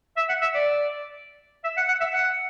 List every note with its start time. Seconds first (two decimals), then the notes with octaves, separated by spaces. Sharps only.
0.17 E5
0.29 F#5
0.41 E5
0.54 D5
1.64 E5
1.77 F#5
1.89 F#5
2.00 E5
2.13 F#5